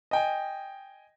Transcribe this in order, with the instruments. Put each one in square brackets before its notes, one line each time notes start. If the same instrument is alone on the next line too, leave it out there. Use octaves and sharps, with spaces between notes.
[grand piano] D#5 G5 G#5